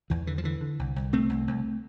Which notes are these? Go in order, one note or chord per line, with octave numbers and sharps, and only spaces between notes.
E2 E3
D3 E3
F3
D3 E3
D3
C2
C2
C3 A3 C4
C2
C2